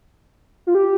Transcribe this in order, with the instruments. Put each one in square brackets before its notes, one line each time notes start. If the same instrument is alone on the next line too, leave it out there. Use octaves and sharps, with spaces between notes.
[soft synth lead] F4
G4